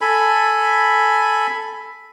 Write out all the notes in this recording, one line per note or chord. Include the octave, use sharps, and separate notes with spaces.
A4 G#5 B5